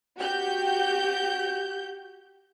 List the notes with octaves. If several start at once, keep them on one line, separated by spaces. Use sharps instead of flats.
F#4 G4 G6